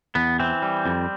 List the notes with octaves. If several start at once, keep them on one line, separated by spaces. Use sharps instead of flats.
E2 B3
E3 C4
G3
F2